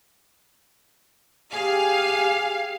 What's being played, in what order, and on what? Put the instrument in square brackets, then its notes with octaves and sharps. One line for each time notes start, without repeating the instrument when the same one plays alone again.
[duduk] G4 [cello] G#4 [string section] F5 [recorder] G#5